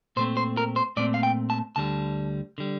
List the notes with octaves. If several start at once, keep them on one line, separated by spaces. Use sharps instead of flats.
A#2 A3 C4 C5
C5
A#4
C5
A#2 A3 C4 D5
F5
G5
A5
D2 D3 G3 A5
D3 G3